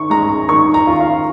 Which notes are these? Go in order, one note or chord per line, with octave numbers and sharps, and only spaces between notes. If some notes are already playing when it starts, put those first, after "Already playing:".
Already playing: D#3 C#6
G#3 A#5
A#5
D#3 C#6
A#5
F4
F5